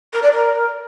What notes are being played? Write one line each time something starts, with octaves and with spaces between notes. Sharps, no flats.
A#4
D5
A#4